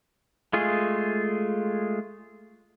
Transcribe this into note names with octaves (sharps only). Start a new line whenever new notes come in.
G#3 A3 F4 G#4